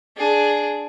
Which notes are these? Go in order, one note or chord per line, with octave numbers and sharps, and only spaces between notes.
D4 G#4